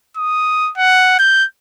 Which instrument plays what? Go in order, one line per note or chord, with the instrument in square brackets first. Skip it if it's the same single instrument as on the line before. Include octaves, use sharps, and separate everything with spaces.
[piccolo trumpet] D#6
F#5
G6